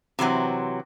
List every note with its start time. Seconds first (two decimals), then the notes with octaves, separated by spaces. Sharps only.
0.19 C3 E3 F#3 C4